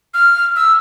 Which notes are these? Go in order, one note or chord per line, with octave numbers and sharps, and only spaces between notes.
F6
E6